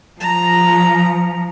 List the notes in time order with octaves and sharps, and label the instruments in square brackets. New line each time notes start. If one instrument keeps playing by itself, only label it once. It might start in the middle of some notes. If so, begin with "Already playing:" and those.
[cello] F3 [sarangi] A#5